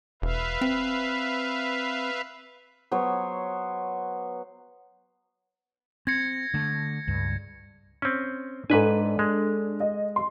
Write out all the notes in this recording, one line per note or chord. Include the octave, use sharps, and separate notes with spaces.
E1 B4 E5 F5
C4
F#3 B3 C5 C#5
C4 G#6 A#6 C#7
D3 A3
C#2 G2
C4 C#4
G#2 D4 A4 B4 G#5
G#3
D#5
C6